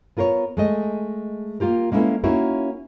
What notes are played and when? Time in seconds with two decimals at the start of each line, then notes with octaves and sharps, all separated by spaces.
0.17 B3 F4 A#4 C5 C#5
0.57 G#3 A3 D#5
1.60 A#3 F4 G4 A#4
1.92 G#3 A#3 C#4 E4 A4 B4
2.24 A#3 C#4 D#4 E4 F#4 A#4